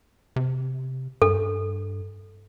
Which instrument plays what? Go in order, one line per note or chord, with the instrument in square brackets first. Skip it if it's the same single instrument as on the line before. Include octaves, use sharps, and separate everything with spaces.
[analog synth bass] C3
[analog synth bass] G2 [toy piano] A4